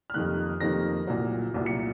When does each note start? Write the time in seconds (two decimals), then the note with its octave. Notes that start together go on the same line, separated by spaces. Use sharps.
0.10 F6
0.14 F2 C3 D#3 A#3 F#6
0.60 F2 C3 D#3 A#3 A#6
1.07 C2 A#2 F#3
1.54 C2 A#2 F#3
1.66 C#7